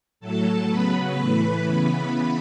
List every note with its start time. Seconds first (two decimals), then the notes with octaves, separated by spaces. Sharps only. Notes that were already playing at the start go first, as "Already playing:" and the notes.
0.20 A2 F#3 A3 A4 A5
0.68 C#3 F#3 B3 B4 B5
1.16 A2 E3 A3
1.63 C#3 E3 B3 B4 B5